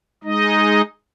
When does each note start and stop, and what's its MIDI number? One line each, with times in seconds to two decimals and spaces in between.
0.24 0.81 56
0.24 0.81 63
0.24 0.81 75